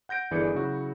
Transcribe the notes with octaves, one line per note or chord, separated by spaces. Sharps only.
F#5 G6 A#6 D7
G1 D3 E3 G#4 D5 C#7
C#3 F#3 E4 F#4